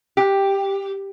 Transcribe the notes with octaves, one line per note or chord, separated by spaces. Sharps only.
G4